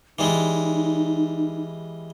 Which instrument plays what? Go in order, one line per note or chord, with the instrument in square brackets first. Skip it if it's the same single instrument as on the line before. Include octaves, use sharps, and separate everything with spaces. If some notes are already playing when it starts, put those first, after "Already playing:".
[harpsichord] E3 G3 G#3 [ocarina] D#4